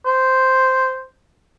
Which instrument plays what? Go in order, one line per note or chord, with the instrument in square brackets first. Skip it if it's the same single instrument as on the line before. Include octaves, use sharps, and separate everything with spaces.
[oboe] C5